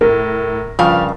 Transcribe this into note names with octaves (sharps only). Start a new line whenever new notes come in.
A2 A#4
G2 C#3 F3 F5